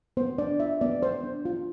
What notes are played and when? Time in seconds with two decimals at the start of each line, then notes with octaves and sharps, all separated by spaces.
0.17 B3 C5
0.38 D4 D5
0.60 F4 E5
0.81 B3 D5
1.02 B3 C5
1.24 D4
1.45 F4